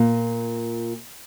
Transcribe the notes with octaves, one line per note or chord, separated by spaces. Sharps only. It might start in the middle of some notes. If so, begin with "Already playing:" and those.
Already playing: A#2